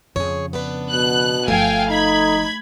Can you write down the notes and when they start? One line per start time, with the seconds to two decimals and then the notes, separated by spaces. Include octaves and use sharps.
0.16 F2 C#3 G#4 C#5
0.53 B3 D4 B4
0.91 B2 F#6
1.48 G1 F3 A3 F5 G5 G#5
1.90 D#4 B5 G#6